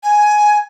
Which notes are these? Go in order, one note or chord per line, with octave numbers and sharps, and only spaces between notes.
G#5